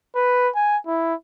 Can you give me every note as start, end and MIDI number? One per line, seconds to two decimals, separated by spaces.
0.15 0.49 71
0.55 0.77 80
0.87 1.14 64